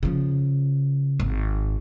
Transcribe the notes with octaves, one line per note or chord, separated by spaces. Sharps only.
C#3 F3
G#1